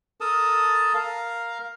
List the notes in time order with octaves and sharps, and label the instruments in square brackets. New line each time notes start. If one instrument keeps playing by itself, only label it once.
[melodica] A4 A#4 A5 D#6
A#4 F5